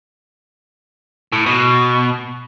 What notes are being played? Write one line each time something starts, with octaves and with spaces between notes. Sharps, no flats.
A2
B2